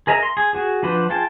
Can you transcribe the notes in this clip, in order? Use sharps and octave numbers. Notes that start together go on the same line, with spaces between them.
G#4 A#4 D#5 E5 A#5
C6
G#4
F#4 G#4
F3 D4 B4 C5 F#5
F4 G#4 G5 A5